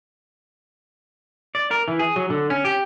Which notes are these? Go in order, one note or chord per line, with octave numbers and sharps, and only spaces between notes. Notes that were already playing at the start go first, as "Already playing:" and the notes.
D5
A#4
E3
G#4
F#3
D3
C#4
G4